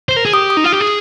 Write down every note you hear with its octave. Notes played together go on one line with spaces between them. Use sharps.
C5
A#4
G#4
G4 D#6
D#6
D#4
F4
G4
G#4